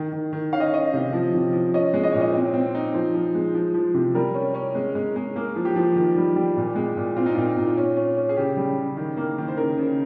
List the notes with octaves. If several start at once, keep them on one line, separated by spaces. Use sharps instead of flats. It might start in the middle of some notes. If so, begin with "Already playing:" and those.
Already playing: D#3
D#3
D#3
C#4 F5
D#5
C#5
C#4 D#5
C3
F3
C3
F3
C#4 D#5
G#3
D#5
A#2 C#5
D#5
C5
C4 C#5
C4
D#4
F3 C5
F3
G#3
F3
F3
C3
G3 A#4
C#4
C#4
G#3
G#3
G#3
A#3 G#4
F3
G4
F3
D#3
G3
G3
A#2
G#3
A#2
C4 F4
D#4
A#2 F4
A#2
C#4
C#4
C#4
G#4
C#3 G4
G3
C#3
D#3
A#3
D#3
C5
C#3 A#4
C#3